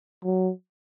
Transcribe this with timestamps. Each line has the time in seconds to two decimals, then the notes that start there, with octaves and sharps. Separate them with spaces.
0.25 F#3